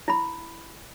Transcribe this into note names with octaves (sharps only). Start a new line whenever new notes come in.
E4 B5